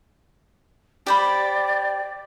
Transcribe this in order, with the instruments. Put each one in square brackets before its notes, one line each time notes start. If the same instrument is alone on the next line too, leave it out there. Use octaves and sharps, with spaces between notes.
[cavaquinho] G4 C5 B5 [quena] D5